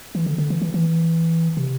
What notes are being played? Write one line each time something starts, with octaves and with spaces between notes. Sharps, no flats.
E3
D3
D3
E3
E3
E3
C3